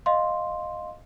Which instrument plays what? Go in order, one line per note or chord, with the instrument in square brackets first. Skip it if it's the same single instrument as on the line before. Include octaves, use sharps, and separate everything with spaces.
[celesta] D#5 F5 C6